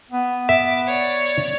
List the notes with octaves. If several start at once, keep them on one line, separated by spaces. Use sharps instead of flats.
B3
E5 D6
C#5 D5